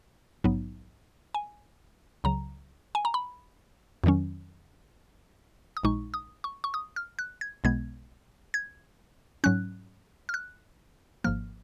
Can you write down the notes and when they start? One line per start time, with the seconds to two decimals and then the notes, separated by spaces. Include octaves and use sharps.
0.44 A#1 G#2 F#3 B3 D#4
1.35 G#5
2.24 C#2 C#3 F#3 A#5
2.95 G#5
3.05 A#5
3.14 B5
4.04 F2 D#3 F#3 C#4
5.77 D#6
5.83 A#1 A#2 G#3 D#4 C#6
6.14 D#6
6.44 C#6
6.64 C#6
6.74 D#6
6.96 F6
7.19 F#6
7.41 G#6
7.64 B1 B2 G#3 B3 G#6
8.54 G#6
9.44 G#2 F#3 C#4 F#6
10.29 F6
10.34 F#6
11.24 G#1 G#2 F3 A#3 F6